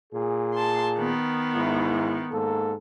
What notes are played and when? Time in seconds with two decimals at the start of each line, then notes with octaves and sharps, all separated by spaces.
0.13 A#2 G#4
0.54 A5 C6
0.97 D#3 B3
1.55 G#2 E4
2.32 G#2 A#3 A4